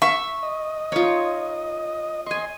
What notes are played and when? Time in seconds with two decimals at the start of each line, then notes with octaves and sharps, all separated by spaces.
0.02 E5 C#6
0.43 D#5
0.92 D#4 F4 C#5
2.27 D#5 G#5 C6 C#6